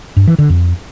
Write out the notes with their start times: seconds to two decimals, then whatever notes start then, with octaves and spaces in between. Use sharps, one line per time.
0.17 G2
0.28 E3
0.39 D3
0.49 F2